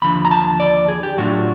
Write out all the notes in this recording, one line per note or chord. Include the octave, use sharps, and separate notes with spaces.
D#2 D3 F3 B5
A#5
A5
D5
G#4
G4
A2 F#3 A3 D4 F4 F#4